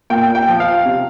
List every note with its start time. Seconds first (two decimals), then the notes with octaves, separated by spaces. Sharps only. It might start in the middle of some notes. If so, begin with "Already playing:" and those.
0.10 A#2 G5
0.35 G5
0.48 F3
0.60 F5
0.85 C3